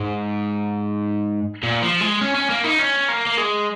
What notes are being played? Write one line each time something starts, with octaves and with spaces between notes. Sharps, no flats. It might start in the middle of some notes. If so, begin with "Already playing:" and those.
Already playing: G#2
A#2
F3
G#3
C#4
C#4
A#3
D#4
C#4
A#3
A#3
G#3